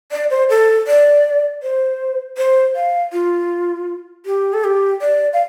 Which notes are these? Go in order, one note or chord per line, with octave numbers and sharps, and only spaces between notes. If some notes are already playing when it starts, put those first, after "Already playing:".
D5
C5
A4
D5
C5
C5
F5
F4
G4
A4
G4
D5
F5